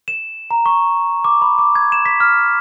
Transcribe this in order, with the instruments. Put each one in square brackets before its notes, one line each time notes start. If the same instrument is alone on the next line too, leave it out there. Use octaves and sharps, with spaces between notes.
[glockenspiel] E7
A#5
C#6
D6
B5
D6
G#6
E7
B6
F6